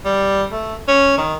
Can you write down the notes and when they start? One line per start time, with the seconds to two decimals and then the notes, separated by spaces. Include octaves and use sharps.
0.05 G3
0.51 A3
0.88 C#4
1.18 D#3